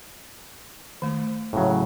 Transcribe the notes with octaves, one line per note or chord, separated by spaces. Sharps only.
D#3 A3
A2 C#3 F#3